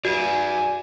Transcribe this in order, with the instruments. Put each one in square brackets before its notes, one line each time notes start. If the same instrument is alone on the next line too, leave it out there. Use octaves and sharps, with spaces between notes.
[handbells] F#4 [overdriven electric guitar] B4 D5 [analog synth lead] G#5